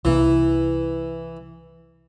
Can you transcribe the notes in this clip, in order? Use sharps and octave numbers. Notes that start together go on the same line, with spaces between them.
C2 E3 A#3